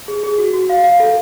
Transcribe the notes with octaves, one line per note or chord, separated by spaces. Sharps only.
G#4
G#4
F#4
F#4
F5
F5
A4